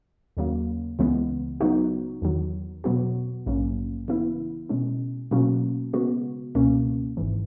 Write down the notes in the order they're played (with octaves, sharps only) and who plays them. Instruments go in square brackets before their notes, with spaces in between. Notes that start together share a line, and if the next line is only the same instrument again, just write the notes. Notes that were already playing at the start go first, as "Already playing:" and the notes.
[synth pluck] D#2 C#3 F#3 A#3
C#2 C#3 E3 G#3 B3
C#3 F#3 B3 D#4 F#4
E2 D#3 F#3
B2 F#3 B3 F#4
A#1 G#2 F#3 A#3 C#4
C#3 E3 B3 E4
B2 G#3 C#4
B2 F#3 A#3 C#4 F#4
C#3 G#3 B3 F#4
C#2 B2 A#3 C#4
G#1 G#2 E3